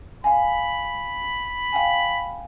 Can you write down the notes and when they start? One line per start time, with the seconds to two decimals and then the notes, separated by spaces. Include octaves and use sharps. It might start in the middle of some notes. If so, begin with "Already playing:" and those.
0.24 F5 G#5 B5
1.72 F5 G5 G#5